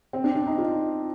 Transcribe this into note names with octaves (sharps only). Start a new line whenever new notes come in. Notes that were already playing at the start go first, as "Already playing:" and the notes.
C4
D4
D4
D#4
F4